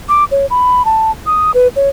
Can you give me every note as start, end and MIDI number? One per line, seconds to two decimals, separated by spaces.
0.09 0.24 86
0.31 0.46 73
0.50 0.85 83
0.85 1.11 81
1.26 1.51 87
1.54 1.68 71
1.76 1.89 73